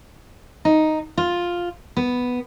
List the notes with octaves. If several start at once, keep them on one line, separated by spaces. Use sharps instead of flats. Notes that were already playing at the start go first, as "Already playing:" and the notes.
D#4
F4
B3